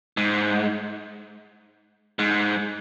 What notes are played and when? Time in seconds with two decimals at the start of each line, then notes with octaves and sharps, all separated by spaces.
0.17 G#2
2.19 G#2